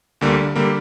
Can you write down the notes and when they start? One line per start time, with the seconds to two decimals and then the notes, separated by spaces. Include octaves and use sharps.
0.21 D2 D3 G3 A#3
0.55 D3 G3 A#3